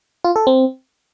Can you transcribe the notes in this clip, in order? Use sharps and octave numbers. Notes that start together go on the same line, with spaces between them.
F4
A4
C4